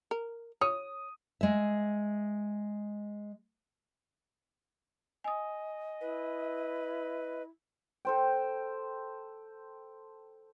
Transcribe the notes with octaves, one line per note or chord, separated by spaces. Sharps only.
A#4
C#5 D#6
G#3 E5
D#5 G#5 D#6
E4 B4
A4 C5 G5